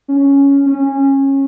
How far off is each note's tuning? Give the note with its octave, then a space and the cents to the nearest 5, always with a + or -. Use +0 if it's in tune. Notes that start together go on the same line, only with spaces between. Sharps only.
C#4 +5
C#4 -20